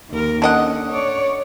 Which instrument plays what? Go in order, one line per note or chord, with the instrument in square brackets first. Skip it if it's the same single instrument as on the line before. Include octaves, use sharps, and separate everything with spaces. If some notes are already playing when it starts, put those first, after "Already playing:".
[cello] D#2 A#4
[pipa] D3 D#5 F#5 [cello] C#4
[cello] C#5 D5